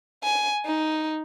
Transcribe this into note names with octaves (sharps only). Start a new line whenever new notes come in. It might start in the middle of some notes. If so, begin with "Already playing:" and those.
G#5
D#4